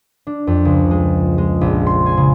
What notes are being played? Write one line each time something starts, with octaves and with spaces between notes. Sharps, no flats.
D4
F2
C#2
G#3
G#3
A#1
C6
G#5
C#3